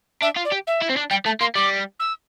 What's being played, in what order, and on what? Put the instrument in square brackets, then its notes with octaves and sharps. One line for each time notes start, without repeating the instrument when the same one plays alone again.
[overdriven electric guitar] D4 [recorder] E5
[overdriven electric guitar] F4
[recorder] D5
[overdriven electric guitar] G4
[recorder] E5
[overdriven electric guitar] E4
C4
D4
[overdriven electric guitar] G3 [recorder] G5
[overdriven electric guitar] A3 [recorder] A5
[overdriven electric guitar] A#3 [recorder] C6
[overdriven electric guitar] G3 [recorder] D6
[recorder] E6